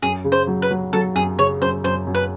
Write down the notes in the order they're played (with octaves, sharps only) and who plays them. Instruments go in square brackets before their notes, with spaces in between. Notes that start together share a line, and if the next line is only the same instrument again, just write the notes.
[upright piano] F#2 [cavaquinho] G#4
[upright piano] C#3
[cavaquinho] C5
[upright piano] F#3
[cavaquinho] B4
[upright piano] F#3
[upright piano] F#3 [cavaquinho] A4
[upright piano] F#2 [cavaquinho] G#4
[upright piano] C#3 [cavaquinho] C#5
[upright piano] F#2 [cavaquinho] C5
[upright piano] F#2 [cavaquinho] C5
[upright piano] F#2
[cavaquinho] B4